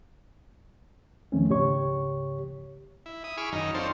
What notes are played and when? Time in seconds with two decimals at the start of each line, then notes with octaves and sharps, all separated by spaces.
1.32 E2 D#3 F3 A3 C4 C#4
1.49 C#2 G#2 C#3 G4 C#5 C#6
3.06 E4
3.24 E4 D#6
3.37 G#4 B5 C#6 D6 E6 F6
3.52 F#2 D#3 D#4 F6
3.74 C4 D4 F4 A4 C5 C#5